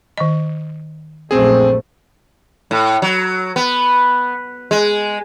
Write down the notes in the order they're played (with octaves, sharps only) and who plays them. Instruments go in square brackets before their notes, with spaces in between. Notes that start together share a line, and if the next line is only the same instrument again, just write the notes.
[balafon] D#3 D#5
[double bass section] A#1 F#2 A3 [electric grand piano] C4 G#4 [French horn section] C5
[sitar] A2
F#3
B3
G#3